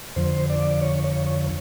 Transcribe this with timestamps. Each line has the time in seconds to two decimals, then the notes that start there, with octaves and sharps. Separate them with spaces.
0.16 F2 D3 F3 C5
0.50 D5
0.81 C#5
1.04 C#5
1.26 C#5